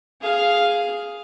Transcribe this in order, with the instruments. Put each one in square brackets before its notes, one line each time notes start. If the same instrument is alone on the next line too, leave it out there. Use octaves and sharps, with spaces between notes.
[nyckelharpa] G#4 F5